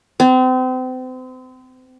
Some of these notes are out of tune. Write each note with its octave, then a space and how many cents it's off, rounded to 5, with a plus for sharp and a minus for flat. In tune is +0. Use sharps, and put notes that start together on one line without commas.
C4 -35